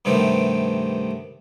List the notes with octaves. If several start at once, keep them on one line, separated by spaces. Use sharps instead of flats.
G2 C3 D#3 A3 B3 C4